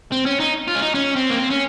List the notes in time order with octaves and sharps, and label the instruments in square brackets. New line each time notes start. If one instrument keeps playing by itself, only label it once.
[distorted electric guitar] C4
C#4
D#4
F4
C#4
D#4
C#4
C4
A#3
C4
C#4